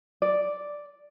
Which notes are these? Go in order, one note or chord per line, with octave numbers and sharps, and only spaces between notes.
D5